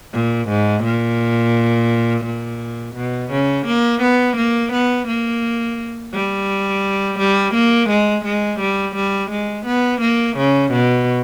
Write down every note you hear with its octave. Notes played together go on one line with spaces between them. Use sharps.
A#2
G#2
A#2
A#2
B2
C#3
A#3
B3
A#3
B3
A#3
G3
G3
A#3
G#3
G#3
G3
G3
G#3
B3
A#3
C#3
B2